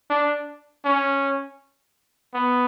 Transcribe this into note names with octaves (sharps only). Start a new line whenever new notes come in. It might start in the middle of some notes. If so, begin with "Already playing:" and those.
D4
C#4
B3